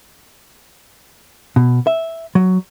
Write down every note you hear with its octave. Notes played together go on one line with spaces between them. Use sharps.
B2
E5
F#3